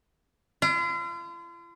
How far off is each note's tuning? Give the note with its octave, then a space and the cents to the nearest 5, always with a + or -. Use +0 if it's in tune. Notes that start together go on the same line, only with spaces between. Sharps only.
F4 -40